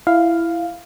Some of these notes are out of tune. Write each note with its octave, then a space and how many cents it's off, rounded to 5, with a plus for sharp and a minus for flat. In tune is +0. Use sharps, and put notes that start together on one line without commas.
E4 +15 F5 +0